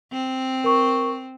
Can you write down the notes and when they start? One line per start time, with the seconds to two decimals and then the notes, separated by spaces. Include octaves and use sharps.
0.13 C4
0.64 A#4 C#6